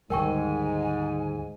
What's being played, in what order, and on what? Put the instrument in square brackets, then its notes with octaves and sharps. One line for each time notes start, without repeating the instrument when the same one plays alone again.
[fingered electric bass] D2 D#3 G3 [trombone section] G#2 [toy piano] A#4 G5 C#6 [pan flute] G#5